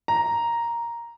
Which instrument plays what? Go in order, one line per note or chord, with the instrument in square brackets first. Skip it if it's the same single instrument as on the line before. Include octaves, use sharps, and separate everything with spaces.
[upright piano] A#5